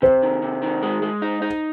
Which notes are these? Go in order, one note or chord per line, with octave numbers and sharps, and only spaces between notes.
C3 C5
D#3
C3
D#3
G#3
G#3
D#4
D#4